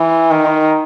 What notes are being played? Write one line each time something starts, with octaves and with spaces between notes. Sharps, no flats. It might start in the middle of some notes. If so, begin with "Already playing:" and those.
Already playing: E3
D#3